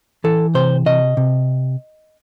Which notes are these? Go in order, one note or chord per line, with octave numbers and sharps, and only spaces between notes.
E3 A4
C3 C5
C3 D#5
C3